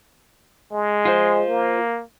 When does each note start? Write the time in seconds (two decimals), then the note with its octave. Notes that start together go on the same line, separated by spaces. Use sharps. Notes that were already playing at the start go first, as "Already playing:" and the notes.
0.72 G#3
1.05 F4 C5
1.48 A#3